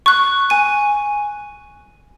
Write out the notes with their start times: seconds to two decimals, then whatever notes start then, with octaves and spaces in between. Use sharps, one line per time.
0.06 C#6 F#6
0.50 G#5 D#7